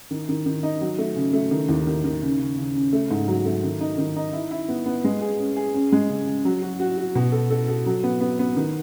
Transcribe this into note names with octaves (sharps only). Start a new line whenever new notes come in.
D#3
D#3
D#3
D#4
F#3
A3
C#3
A3
D#3
D#2
D#3
D#3
C#3
C#3
C#3
C#3
A3
G#2
F#3
A3
D#3
D#4
D#3
D#4
E4
E4
B3
B3
G#3
G#4
C#4
G#4
C#4
G#3
C#3
C#3
F#3
F#4
F#4
F#4
B2
A4
A4
A4
F#3
B3
B3
B3
D#3